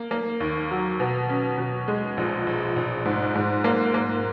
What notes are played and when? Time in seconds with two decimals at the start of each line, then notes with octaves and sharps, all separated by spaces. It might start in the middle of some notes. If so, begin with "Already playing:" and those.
Already playing: A#3
0.11 A#3
0.40 D#2
0.71 F#3
1.00 B2
1.29 C#4
1.58 B2
1.88 G#3
2.17 A#1
2.47 A#1
2.76 A#1
3.05 G#2
3.35 G#2
3.64 A#3
3.94 A#3